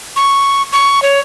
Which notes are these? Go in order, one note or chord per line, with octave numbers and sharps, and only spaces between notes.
C#6
C#6
C#5